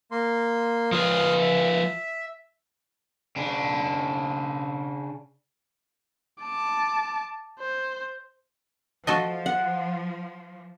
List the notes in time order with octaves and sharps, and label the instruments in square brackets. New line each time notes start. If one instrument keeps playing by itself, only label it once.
[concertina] A#3 C6
[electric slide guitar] F3 F4 B4 [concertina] C6 D#6 F6
[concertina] E5
[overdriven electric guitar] C#3 D4
[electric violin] A5 D6
C5
[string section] F3 [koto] F#4 A4 D#5
[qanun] F#5